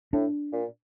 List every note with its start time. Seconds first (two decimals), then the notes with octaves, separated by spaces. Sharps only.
0.13 A2 D4
0.53 A#2